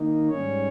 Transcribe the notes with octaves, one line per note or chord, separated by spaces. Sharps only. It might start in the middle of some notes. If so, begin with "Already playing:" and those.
Already playing: D#3 A#3 D#4
G#2 G3 C#4 C#5